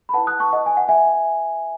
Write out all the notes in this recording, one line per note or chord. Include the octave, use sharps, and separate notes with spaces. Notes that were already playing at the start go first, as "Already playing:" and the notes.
B5
E4 B4 F#5 A5
D#6 F#6
A5 C#6
D#5 F#5
G#5
F#5
E5 G#5